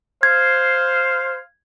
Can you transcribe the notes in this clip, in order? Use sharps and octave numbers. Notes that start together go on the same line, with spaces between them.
C5 F5 G#6